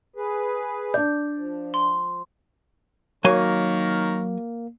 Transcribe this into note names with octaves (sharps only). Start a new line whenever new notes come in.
G#4 B4
D4 D5 G6
F3
C6
D#3 F#3 A#3 A#4 C#5 G#5